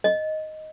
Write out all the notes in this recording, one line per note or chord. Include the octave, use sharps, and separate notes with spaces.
D#5